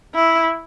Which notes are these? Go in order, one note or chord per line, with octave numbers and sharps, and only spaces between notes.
E4